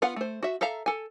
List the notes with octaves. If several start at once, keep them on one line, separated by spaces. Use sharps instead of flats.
B3 F4 F5 F#5
A3 C5
F#4 E5
A4 E5 F5 A#5
A4 G#5